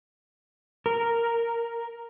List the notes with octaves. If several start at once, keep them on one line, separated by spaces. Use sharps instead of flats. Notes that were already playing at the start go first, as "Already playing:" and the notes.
A#4